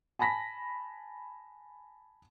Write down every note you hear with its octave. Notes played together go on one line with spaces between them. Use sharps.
G#5 A5 B5 A#6 B6